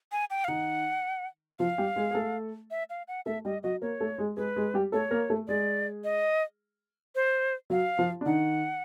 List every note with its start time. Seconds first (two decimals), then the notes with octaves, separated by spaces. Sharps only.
0.12 G#5
0.30 G5
0.44 F5
0.48 D#3 D#4 F#5
1.59 F3 F4 F5
1.78 G3 G4
1.96 G#3 G#4
2.11 G#4
2.15 A3 A4
2.71 E5
2.90 F5
3.08 F#5
3.26 A3 A4 E5
3.45 G3 G4 D#5
3.63 F#3 F#4 D#5
3.82 A#3 A#4 C#5
4.00 A3 A4
4.18 G#3 G#4
4.37 G#3 G#4 B4
4.56 G#3 G#4
4.74 G3 G4
4.92 A3 A4 C#5
5.11 A#3 A#4
5.30 A3 A4
5.48 G#3 G#4 D5
6.04 D#5
7.15 C5
7.70 F#3 F#4 F5
7.98 F3 F4
8.21 D4
8.26 D#3 D#4 F#5